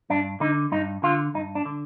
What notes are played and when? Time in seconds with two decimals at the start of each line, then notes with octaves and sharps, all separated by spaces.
0.10 G2 D4
0.40 D3 D#4
0.72 G2 D#4
1.03 D3 F4
1.34 G2 D#4
1.55 D4
1.65 D3